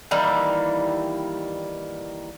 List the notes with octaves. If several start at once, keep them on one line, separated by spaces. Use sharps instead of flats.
D#3 E3 G3 A#3